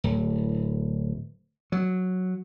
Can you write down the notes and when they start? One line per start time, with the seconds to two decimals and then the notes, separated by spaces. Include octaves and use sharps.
0.04 D1
1.72 F#3